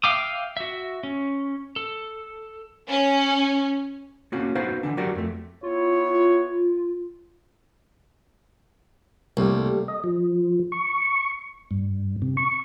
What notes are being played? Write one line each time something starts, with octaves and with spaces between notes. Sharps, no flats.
E5 F5 G5 D6 D#6
F#4 E5
C#4
A4
C#4
A#3 C4 C#4 F#4
B3 D#4 F#4 B4 C5 F5
D3 E3 D4
F#3 F#4 G4 A#4 D5
F2 A3
B3 E4 F4 C#5
C2 G3 A3 A#3
D#5
F3
C#6
G2
C3
C#6